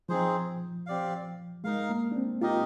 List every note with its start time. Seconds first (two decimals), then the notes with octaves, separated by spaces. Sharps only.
0.09 F3 C4 D#4 G#4 C5
0.86 C4 G4 D5 F5
1.64 G#3 D#4 A#4 F5
1.90 A#3
2.12 D4
2.16 C4
2.41 D#4 F4 G4 A#4 D#5